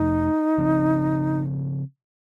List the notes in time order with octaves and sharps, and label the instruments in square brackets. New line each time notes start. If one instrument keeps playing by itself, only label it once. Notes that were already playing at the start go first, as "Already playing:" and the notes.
Already playing: [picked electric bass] F2 C3 F3 A3 [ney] D#4
[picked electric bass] C#3 F3 C4